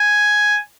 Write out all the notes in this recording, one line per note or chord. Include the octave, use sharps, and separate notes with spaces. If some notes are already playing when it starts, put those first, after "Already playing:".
Already playing: G#5